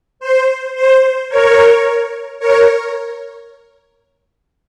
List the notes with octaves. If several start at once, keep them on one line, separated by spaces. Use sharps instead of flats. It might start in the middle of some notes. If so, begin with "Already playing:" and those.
C5
C5
A#4 C#5
A#4 C#5